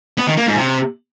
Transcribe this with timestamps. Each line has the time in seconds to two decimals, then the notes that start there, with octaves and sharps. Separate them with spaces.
0.18 B3
0.27 D#3
0.37 A#3
0.47 G#2
0.57 C3